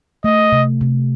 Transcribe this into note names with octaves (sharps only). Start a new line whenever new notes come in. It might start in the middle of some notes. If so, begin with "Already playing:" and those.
A3 D#5
C3
C3